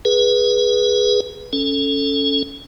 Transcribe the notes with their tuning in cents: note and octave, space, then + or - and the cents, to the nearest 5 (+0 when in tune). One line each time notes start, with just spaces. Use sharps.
G#4 +0 B4 -15
C#4 +0 A4 +0